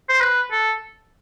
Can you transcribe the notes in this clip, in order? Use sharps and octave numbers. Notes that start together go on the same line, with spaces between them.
C5
B4
A4